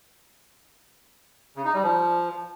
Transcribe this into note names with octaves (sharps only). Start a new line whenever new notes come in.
C#3
D#4
G3
F3